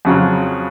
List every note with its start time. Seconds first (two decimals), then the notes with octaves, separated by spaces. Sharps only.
0.05 F2 C#3 F#3